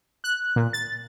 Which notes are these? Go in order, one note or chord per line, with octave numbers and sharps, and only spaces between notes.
F#6
A#2
A6